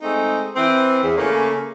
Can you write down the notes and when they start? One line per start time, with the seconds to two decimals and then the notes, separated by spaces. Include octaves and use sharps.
0.02 G#3 A3 C4 D#4
0.56 E3 C4
1.03 E2
1.18 C#3 A3 A#3 C#4